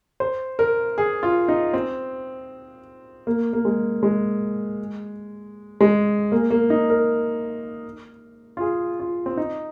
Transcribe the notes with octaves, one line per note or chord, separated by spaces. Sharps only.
C5
A#4
G#4
F4
D#4
C4
A#3
A#3
G#3
G#3
G#3
A#3
A#3
D#4
A#4
F4
G#4
F4
C4
D#4